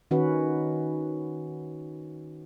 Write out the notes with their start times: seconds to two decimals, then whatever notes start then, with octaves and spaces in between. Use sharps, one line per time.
0.11 D#3 C#4 F#4 B4